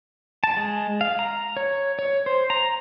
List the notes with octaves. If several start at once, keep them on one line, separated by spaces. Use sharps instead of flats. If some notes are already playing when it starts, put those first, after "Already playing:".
A5
G#3
F5
A#5
C#5
C#5
C5
A#5